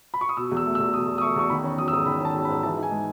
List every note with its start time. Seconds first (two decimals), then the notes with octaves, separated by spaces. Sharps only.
0.14 B5
0.21 C#6
0.29 D#6
0.37 B2 E6
0.51 E2
0.57 E6
0.66 A3
0.75 E6
0.80 E2
0.94 B2 D#6
1.08 E2
1.18 D#6
1.21 A3 C#6
1.36 E2 C#6
1.50 D#3 B5
1.64 C#4
1.78 F#3 D#6
1.88 E6
1.92 G#2 D#6
2.06 D#3 B5
2.21 C#4 A5
2.34 F#3
2.45 B5
2.49 G#2
2.63 E3 A5
2.78 D#4 G#5
2.91 G#3